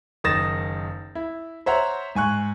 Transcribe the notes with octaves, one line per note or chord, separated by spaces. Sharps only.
F#1 D#3 D#6 A6 A#6 E7
E4
C5 C#5 E5 F#5 A#5
G#2 G#5 C#6 F#6